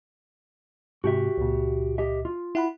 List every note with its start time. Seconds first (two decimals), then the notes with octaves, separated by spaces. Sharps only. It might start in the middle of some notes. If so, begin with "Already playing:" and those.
1.04 G#2 C3 F#4 G4 E5
1.38 C#2 A#2
1.98 G4 D#5 E5
2.25 F4
2.55 E4 F#5 B5